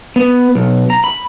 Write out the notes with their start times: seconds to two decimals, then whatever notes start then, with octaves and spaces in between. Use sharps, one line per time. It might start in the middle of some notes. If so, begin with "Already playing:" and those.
0.16 B3
0.55 B1
0.90 A#5
1.04 B5